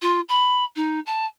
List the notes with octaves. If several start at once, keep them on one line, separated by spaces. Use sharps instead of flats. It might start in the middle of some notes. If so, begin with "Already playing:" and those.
F4
B5
D#4
A5